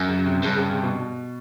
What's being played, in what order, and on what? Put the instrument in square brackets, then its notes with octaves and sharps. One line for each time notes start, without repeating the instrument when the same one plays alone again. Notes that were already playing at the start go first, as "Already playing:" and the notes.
Already playing: [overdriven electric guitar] F#2
[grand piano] C#3
C3
[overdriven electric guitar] G2 [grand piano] C#3
[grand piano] C#3
C3
B2